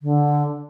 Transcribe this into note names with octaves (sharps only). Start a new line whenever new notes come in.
D3